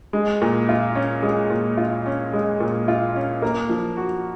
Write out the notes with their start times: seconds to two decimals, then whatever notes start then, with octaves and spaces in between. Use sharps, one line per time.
0.13 G#3
0.42 A#2
0.69 F4
0.95 C#4
1.23 G#3
1.50 A#2
1.77 F4
2.06 C#4
2.33 G#3
2.60 A#2
2.88 F4
3.16 C#4
3.42 A#3
3.69 F3
3.97 F#4